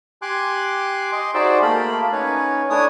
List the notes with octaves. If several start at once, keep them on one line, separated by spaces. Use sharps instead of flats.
G4 G#5 C6 D6 F#6
D#5 C6 D6
D#4 F#4 G#4 C5 D5 E5
A3 A#3 A4 F5 B5
C#4 D#4 B4 C#5
A3 D4 E4 C#5 G#5 D#6